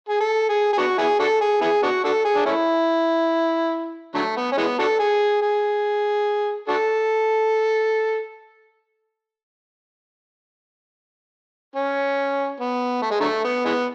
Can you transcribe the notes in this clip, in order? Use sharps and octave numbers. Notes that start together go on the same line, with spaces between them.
G#4
A4
G#4
G#4
B3 D4 F#4
B3 E4 G#4
D4 F#4 A4
G#4
B3 E4 G#4
B3 D4 F#4
D4 F#4 A4
G#4
D4
A3 C#4 E4
D3 F#3 A3
B3
C#4
E3 G#3 B3
D4 F#4 A4
G#4
G#4
D4 F#4 A4
C#4
B3
A3
G#3
D3 F#3 A3
B3
E3 G#3 B3